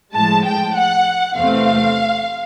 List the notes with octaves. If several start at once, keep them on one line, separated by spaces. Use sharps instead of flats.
A2 F3 G#3 A5
G5
F#5
E2 C3 E3 A3 C4 F5